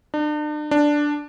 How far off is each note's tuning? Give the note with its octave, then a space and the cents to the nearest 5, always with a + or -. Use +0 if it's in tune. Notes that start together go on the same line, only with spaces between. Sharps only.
D4 +40
D4 +0